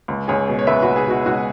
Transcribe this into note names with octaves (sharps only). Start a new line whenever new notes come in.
C#2
C#2 G#4 C#5
B2
C#5
C#2 B4 E5
C#2 F#4 B4
G#4
B2 F#4
C#2 F#4